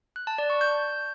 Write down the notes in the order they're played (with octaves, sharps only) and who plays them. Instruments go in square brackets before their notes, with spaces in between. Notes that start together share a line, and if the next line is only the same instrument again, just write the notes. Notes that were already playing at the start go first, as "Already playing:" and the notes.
[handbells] F#6
A5
D5
C#6
G6